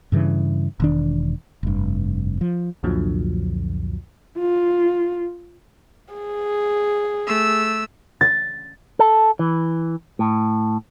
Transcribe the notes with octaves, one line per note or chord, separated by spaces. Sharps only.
G2 C#3 E3
E1 D#3 D4
F1 G2
F3
C2 F2 A#2 D3 F3 F#3
F4
G#4
A3 E6
A6
A4
E3
A2